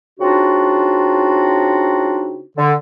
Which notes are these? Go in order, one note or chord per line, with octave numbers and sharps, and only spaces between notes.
C#3 C4 D4 D#4 F4 F#4
D3